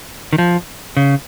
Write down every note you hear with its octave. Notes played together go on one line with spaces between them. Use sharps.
D#3
F3
C#3